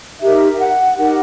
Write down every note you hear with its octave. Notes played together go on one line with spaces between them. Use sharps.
D#4 G4 A#4 E5
F#5
D#4 G4 A#4 F#5